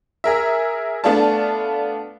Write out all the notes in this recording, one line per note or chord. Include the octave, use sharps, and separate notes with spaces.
G#4 A#4 E5
A3 B3 D4 F4 D5 A5